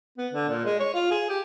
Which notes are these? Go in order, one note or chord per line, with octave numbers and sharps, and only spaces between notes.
B3
D3
A#2
G#3
C#5
F4
G#4
G4